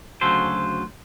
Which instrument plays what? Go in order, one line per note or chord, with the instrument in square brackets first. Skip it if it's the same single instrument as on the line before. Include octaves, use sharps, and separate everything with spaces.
[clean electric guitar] D2 C#3 F#3 F4 A4 C5